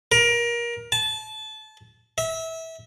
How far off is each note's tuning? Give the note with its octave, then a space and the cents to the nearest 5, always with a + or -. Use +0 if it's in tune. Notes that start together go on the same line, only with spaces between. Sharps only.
A#4 +25
A5 -25
E5 -25